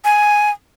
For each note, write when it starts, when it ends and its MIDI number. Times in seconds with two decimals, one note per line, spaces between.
0.05 0.50 80